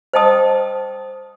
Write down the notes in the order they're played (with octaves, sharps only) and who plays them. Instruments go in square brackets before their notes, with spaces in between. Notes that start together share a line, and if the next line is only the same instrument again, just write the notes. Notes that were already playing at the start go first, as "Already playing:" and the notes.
[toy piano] C5 D#5 G5 A5 D#6